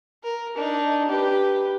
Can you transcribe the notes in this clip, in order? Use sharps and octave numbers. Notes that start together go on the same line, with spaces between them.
A#4
D4 D#4
G4 B4